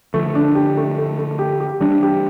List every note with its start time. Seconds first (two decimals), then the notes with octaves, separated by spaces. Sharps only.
0.14 D3 F3 A3
0.35 D4
0.55 G4
0.77 A3
0.98 A3
1.18 A3
1.39 G4
1.60 G4
1.81 E3 G3 D4
2.03 G4